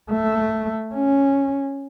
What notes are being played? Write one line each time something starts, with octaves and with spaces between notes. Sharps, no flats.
A3
C#4